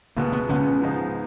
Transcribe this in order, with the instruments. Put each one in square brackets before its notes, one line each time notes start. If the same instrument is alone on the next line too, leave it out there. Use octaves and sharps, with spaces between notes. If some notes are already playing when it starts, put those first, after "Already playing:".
[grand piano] C#2 B2 G#3 B3 [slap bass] A#3
[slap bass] B3
[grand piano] C#2 B2 G#3 B3 [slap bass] C#4
[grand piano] G#2 F3 B3 D#4 G#4